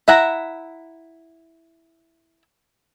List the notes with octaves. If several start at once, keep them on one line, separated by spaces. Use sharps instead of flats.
E4 E5 F#5 A#5